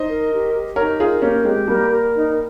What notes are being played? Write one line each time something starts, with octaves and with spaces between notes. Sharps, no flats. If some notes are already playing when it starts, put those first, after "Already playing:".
Already playing: D#4 C5 D#5
A#4
G4
G4
D#4 A#4 C#5
F4 G#4 A#4
A#3 C#4 G4
G#3 C4 G4
G3 A#3 A#4
A#4
D#4